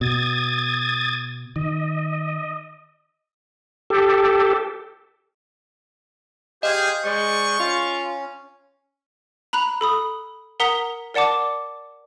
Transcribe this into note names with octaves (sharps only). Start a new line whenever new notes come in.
B2 D#6 G#6 A6
D#3 D#5
G4 A4
G4 G#4 C5 D#5 F5
G#3 C5 D5 C#6
C#4 F4
A#5 B5 F#6 F7
A4 B5 D#6
A#4 F#5 A#5 D#6 B6 G7
A#4 D5 F#5 A5 D6